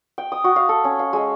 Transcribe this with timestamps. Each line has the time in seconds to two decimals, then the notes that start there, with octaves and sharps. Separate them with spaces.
0.18 G5
0.32 D#6
0.44 F#4
0.56 F5
0.69 A4
0.84 C#4
0.99 F5
1.13 G#3